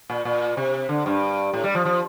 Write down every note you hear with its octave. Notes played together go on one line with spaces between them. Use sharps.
A#2
A#2
C3
D3
G2
A2
G3
F3
F3